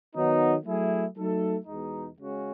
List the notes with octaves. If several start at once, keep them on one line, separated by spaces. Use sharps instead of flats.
D#3 F#3 B3 D#4
F#3 A3 E4 G#4
F#3 A3 D#4 A4
E2 B2 G#3 D#4
C#3 G#3 C#4 F#4